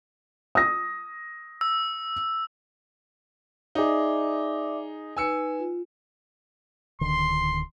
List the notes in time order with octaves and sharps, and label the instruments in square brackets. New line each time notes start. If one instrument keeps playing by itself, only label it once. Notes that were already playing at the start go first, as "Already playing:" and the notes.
[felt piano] D#6 A#6
[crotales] E6
[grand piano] D#4 G#4 [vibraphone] D5 E5 D6
[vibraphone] D#4 B4 [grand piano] G#5 E6 C#7
[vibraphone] F4
[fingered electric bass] D1 D3 D#3 [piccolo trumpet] C6